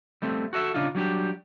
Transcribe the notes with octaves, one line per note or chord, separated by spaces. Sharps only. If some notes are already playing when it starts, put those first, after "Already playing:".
G3 A3 C4
F#4 A4 D#5 E5
C#3 D4 D#4 F4
F#3 G3 D4 G4